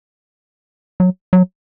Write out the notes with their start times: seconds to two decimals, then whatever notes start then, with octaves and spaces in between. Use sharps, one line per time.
1.00 F#3
1.33 F#3